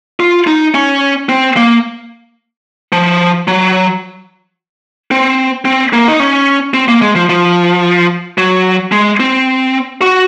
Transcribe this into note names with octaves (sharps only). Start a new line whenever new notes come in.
F4
D#4
C#4
C4
A#3
F3
F#3
C4
C4
A#3
D#4
C#4
C4
A#3
G#3
F3
F3
F#3
G#3
C4
F#4